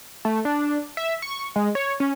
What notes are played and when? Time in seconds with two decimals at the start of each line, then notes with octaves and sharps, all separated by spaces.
0.25 A3
0.45 D4
0.97 E5
1.22 C#6
1.56 G#3
1.75 C#5
2.00 C#4